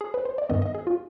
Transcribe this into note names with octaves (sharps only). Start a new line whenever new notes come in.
G#4
B4
C5
D5
G2 D#3 B3 D#5
D#5
G#4
F4